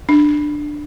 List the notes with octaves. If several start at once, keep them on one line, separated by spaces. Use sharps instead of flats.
D4